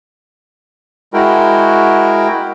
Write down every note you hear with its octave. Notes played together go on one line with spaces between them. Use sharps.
G#3 E4 F#4 A#4 G5